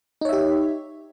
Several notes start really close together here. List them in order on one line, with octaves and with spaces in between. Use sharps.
D#4 C#5 E5 G4